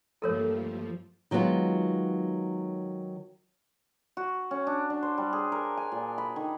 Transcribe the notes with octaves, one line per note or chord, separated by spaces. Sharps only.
G2 F3 A3 A#3 A4 A#4 C#5
D#3 F#3 G#3 B3 F4
F#4
C#4
D4
D4
C5
G3
G#4
A#4
G#5
A#2
B5
D#3